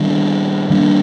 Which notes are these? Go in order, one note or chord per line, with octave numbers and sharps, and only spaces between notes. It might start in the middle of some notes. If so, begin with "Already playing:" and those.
Already playing: D#3 G3 D4
D#3 G3 A#3 D4